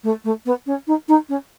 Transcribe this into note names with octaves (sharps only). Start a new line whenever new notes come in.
A3
A3
B3
C#4
D#4
D#4
C#4